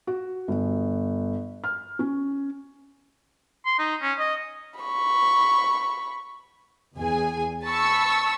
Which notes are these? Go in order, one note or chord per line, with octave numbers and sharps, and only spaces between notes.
F#4
G1
F6
C#4
C6
D#4
C#4
D#5
B5 C#6
E2 G#4 G#5
A5 B5 C#6 E6